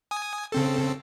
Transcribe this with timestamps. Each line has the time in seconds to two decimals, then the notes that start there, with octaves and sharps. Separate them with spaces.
0.11 G#5 D#6
0.52 C#3 C4 A4